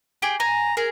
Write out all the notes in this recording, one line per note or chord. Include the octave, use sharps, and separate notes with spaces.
G4 G#4 G5
G#5 A#5
G#4 A#4